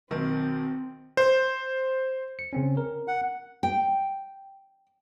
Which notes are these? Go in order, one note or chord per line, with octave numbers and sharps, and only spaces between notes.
B1 D#3 C4
C5
C#7
C#3 C4 C#4
A#4
F#5
G5